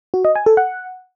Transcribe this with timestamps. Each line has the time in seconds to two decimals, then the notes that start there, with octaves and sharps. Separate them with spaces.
0.14 F#4
0.25 D#5
0.35 G#5
0.46 A4
0.57 F#5